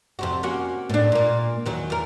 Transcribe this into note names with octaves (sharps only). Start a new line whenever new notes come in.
F2 C3 F#4
A#3 C#4 F#4
A2 D4
A#2 A#3
E2 D#3 F#3
E2 A#4